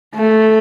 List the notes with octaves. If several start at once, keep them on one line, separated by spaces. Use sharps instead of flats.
A3